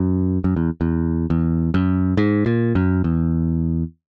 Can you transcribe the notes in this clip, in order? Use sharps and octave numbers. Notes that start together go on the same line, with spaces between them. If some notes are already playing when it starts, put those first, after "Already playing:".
Already playing: F#2
F#2
E2
E2
E2
F#2
G#2
A#2
F#2
E2